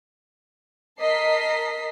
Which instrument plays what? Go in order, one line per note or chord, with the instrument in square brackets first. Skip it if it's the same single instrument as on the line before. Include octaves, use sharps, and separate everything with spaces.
[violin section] A#4 D#5 A5 B6 C7